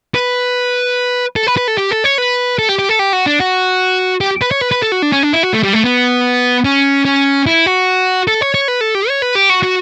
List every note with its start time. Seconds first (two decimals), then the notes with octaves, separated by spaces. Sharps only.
0.15 B4
1.36 A4
1.47 B4
1.57 B4
1.68 A4
1.78 G4
1.91 A4
2.04 C#5
2.18 B4
2.59 A4
2.69 G4
2.79 G4
2.89 A4
2.99 G4
3.13 F#4
3.26 D4
3.40 F#4
4.21 G4
4.41 B4
4.51 C#5
4.61 B4
4.71 B4
4.82 A4
4.92 F#4
5.02 D4
5.12 C#4
5.23 D4
5.33 E4
5.43 F#4
5.53 A3
5.63 G3
5.73 A3
5.84 B3
6.65 C#4
7.05 C#4
7.47 E4
7.66 F#4
8.27 A4
8.41 C#5
8.54 C#5
8.68 B4
8.81 A4
8.95 G4
9.09 C#5
9.22 B4
9.35 G4
9.50 F#4
9.63 F#4